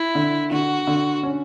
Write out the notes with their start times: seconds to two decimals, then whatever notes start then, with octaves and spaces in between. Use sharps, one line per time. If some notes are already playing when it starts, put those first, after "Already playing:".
Already playing: E4
0.15 D3
0.51 D3 F#4
0.87 D3
1.23 C#4